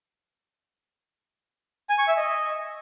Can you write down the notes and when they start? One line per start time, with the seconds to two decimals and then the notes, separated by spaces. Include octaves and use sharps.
1.90 G#5
1.99 C#6
2.08 E5
2.17 D#5